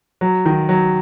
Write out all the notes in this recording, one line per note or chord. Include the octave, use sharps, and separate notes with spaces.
F#3
D#3
F#3